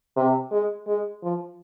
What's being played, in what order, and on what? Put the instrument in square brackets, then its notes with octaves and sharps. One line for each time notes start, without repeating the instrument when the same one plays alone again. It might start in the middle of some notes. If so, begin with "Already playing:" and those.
[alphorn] C3
G#3
G#3
F3